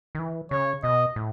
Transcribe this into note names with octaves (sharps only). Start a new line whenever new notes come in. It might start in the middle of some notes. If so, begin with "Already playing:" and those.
D#3
E3
C#3 C#5
B2 D#5
A2